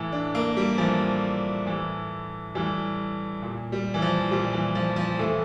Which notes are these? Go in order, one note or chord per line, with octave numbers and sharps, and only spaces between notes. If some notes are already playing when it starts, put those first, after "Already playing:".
Already playing: A2 E3
D4
A#3
G3
A2 E3 F3
A2 E3
A2 E3 G3
A#2
G3
E3
F3
A#2 G3
E3
F3
F3
A2 E3 A3